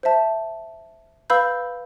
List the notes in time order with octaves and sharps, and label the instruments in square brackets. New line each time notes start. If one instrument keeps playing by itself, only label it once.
[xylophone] C5 E5 A5
B4 F5 B5 E6 G6